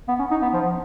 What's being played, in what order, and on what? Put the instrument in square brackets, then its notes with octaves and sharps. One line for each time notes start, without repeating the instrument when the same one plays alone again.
[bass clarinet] B3
C#4
D#4
B3
F3